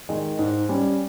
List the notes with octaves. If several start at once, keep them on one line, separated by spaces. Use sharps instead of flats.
D#3 G#3
G#2
G3 C#4